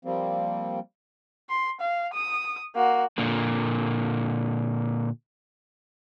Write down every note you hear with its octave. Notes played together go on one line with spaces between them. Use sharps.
F3 G3 A#3 C4
C6
F5
D#6
A#3 F#4
A#2 D3 A#3